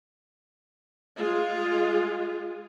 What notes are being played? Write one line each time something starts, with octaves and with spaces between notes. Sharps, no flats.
G#3 F4 G#4